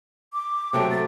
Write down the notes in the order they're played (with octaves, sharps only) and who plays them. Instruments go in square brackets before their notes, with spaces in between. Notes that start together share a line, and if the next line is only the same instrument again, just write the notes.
[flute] D6
[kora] C3 F#3 A3 [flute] G5
[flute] A6